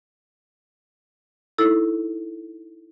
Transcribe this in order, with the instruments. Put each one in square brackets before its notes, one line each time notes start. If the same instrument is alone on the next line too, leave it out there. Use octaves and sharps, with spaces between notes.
[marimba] D#4 E4 A4